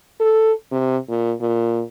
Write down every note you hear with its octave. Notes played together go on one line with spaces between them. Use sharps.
A4
C3
A#2
A#2